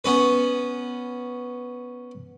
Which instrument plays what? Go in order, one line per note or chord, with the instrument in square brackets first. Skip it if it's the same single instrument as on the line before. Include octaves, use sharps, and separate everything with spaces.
[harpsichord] B3 C#4 B4